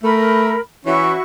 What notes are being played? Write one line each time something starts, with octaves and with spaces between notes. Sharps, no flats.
A3 A#4 B5
E3 C#4 E4 F#4 C#6